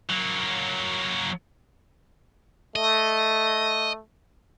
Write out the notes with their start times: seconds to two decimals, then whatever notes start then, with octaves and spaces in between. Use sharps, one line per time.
0.10 F#3 A#3
2.76 A3 D#5